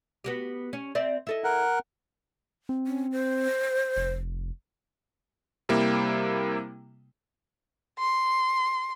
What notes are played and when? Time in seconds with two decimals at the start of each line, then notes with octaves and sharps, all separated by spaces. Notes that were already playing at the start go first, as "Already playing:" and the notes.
0.24 B3 F#4 G4
0.73 C#4
0.95 C4 D5 E5
1.27 E4 A4 D#5
1.44 A#4 F#5
2.69 C4
2.87 C#4
3.12 C5
3.96 F1
5.69 C3 G3 A#3 E4
7.99 C6